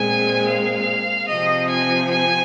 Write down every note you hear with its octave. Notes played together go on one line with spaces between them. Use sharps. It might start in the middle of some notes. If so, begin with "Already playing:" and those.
Already playing: A#2 G#3 C4 G#5
F5
C3 F3 C4 D#5
G#5
G#5